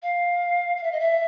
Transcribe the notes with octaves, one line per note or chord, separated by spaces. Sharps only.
F5
F5
E5
D#5
E5